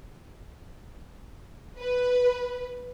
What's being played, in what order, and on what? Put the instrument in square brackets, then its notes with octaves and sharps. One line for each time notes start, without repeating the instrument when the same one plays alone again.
[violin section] B4